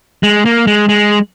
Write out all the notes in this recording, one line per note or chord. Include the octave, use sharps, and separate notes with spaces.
G#3
A#3
G#3
G#3